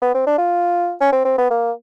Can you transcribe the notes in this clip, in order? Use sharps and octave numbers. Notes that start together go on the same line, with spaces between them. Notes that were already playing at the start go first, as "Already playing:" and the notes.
B3
C4
D4
F4
C#4
C4
C4
B3
A#3